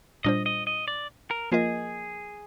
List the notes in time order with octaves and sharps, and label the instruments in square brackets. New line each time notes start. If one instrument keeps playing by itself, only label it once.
[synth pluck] A#2 G3 D4 F4 C5 [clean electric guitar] D#5
[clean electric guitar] D#5
D#5
D5
A#4
[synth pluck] F3 A#3 F4 A#4 D#5 [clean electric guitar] G#4